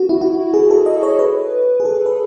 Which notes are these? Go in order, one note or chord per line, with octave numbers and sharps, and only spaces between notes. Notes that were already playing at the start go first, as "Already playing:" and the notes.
Already playing: F#4
E4
F#4
G#4
A4
D#5
C#5
B4
G#4
A4
B4